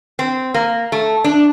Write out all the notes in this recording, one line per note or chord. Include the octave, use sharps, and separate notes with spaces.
C4
A#3
A3
D4